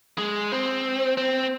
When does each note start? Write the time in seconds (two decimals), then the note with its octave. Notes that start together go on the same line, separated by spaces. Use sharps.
0.18 G#3
0.52 C4
1.17 C4